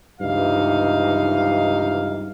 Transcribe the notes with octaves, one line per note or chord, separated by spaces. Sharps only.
C#2 G2 C3 E3 D#4 F5